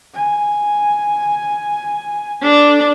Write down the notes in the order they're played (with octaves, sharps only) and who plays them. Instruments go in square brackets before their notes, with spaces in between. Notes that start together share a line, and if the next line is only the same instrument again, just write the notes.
[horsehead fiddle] G#5
[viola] D4 [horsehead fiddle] A4